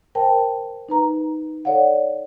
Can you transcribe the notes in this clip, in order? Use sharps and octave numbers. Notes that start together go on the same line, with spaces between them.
A#4 C5 G5 A5
D#4 B4 A#5
A4 C#5 D5 F5 F#5